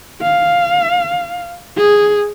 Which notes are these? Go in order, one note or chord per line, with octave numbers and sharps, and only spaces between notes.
F5
G#4